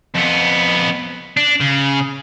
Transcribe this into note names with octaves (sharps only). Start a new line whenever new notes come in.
F2 B3
D4
C#3